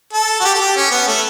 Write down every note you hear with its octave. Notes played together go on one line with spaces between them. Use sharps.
A4
F#4
G4
A4
G4
C#4
B3
A3